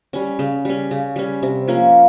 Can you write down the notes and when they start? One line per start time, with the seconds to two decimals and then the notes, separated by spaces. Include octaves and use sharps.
0.13 G3 C#4
0.39 C#3
0.65 G3 C#4
0.91 C#3
1.16 G3 C#4
1.42 C3
1.68 F3 A#3 C#4